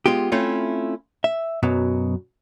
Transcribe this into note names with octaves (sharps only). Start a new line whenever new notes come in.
G#3 B3 F4 G4
A3 C4 C#4 E4 F4
E5
F#2 B2 F#3